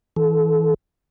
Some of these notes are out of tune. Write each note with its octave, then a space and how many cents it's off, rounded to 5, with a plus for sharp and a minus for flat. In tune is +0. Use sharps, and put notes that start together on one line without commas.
E3 -30 A4 -25